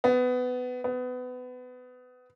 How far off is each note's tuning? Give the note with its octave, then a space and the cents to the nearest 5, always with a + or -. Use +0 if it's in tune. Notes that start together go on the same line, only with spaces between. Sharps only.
B3 +20
B3 +25